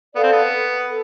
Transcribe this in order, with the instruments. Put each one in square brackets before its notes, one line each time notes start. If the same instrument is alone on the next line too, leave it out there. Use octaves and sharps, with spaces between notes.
[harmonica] B3 [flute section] A4 D5 F5
[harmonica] C4
B3
[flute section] A4